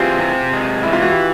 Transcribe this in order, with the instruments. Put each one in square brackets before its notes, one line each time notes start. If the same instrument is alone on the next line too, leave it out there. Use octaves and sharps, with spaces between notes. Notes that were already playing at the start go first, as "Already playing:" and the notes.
Already playing: [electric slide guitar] E3 C4 [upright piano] F4 G4 G#4
[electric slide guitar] C3
G#3
[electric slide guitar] E3 [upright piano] E4
[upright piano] F4
F#4
G4